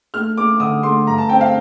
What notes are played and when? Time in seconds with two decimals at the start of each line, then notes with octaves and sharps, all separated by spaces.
0.14 A3 F6
0.37 A3 D6
0.60 D3 D#6
0.83 A3 C6
1.07 G2 A#5
1.18 A5
1.29 C4 G5
1.41 F5